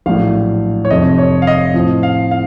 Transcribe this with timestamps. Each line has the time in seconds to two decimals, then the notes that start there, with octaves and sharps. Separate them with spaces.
0.06 A#1 A2 F#3 F5
0.85 C#5
0.91 F1 F2 C3 D#5
1.18 C#5
1.42 F5
1.47 D#5
1.74 A2 F3 C4
2.03 F5
2.31 F5